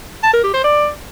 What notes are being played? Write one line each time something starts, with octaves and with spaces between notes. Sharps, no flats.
A5
A#4
G4
C5
D5